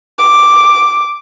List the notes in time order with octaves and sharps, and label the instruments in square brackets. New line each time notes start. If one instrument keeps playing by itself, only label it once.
[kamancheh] D6